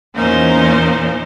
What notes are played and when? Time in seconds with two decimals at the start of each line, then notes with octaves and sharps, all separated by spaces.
0.15 E2 A#2 C#4 D#4 A#4 C5